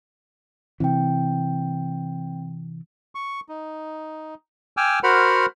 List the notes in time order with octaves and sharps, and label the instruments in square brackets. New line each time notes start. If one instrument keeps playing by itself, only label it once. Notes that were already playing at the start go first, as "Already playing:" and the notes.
[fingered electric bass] C3 E3 [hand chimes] C4 G5
[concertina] C#6
D#4
G5 G#5 D6 E6 F6
F#4 A#4 C5 F#5 B5 F6